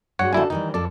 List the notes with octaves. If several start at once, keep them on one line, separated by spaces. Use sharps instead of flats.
G2 G#3 F#4 C#5 F#5
G1 D4 E4 F#4 A4 G#5
D#3 E3 G3 D#4
F2 F3 A4 D5